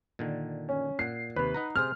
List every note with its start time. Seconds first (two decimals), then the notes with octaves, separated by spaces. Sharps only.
0.19 A#2 D3 D#3
0.69 C#4
0.99 A#2 F#5 C7
1.36 D#2 C3 B4
1.54 D#4 F#5 A#5
1.76 C3 G#4 C5 F6